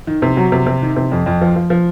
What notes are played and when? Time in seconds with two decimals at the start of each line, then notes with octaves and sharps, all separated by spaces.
0.07 D#3
0.22 C3
0.37 F#3
0.52 C3
0.66 C3
0.82 D#3
0.96 C3
1.12 F2
1.26 F2
1.41 F3
1.56 F3
1.70 F3